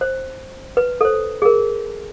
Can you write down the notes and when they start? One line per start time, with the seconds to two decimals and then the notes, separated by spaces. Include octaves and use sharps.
0.01 C5
0.77 B4
1.01 A4 C5
1.42 G#4 A#4